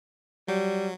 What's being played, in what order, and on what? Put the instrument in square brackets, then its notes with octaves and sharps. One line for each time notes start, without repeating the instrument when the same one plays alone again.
[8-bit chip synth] F#3 [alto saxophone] G3